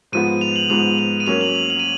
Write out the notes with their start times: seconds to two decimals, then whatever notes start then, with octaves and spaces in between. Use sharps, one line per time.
0.12 G#2 F3 B3 D#7
0.41 F7
0.56 F#7
0.70 G#2 F3 B3 F7
0.99 F#7
1.20 D#7
1.27 F#3 A#3 C#4 F7
1.41 F#7
1.55 F7
1.70 F#7
1.79 D#7